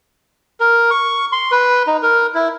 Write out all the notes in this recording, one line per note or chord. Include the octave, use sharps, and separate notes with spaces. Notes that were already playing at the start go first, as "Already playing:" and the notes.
A#4
C#6
C6
B4
D#4
A#4
E4